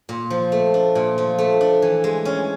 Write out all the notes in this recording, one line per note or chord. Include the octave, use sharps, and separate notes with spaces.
A#2
F3
A3
D4
A#2
F3
A3
D4
E3
G#3
C#4